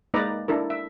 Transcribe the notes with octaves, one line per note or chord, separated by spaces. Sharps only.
G#3 A#3 D#4 B4 D5 A#5
D4 E4 A4 A#4
E5